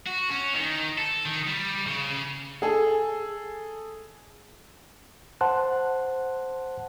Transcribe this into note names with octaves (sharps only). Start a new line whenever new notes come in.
F#4
C#4
D#3
A4
D#3
G3
C#3
G#4 A4
C5 F#5 A5 C6 F#6